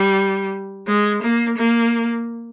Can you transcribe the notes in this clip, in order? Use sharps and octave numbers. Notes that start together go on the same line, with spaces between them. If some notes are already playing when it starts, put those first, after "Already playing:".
Already playing: G3
G#3
A#3
A#3